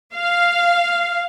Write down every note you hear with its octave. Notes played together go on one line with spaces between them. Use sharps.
F5